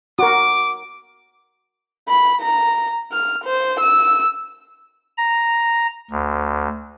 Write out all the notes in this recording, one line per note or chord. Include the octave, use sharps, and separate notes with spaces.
F#4 A#4 D6
B5
A#5
F6
C5
E6
A#5
D2